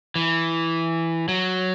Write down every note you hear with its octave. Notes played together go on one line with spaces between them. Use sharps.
E3
F#3